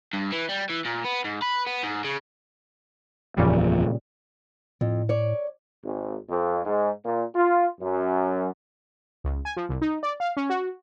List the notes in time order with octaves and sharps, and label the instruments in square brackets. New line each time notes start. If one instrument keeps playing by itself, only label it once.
[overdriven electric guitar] G2
E3
G3
E3
A#2
B3
G#2
B4
B3
G#2
C#3
[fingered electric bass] F#1 E2 F3 [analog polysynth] A#2 C#3 G3
[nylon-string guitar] F2 [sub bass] A2
[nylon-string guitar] C#5 D5
[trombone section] G#1
F2
G#2
A#2
F4
F#2
[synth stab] C#2
G#5
F3
C2
D#4
D5
F5
C#4
F#4